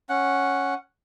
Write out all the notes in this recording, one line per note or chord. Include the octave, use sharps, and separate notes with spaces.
C#4 F#5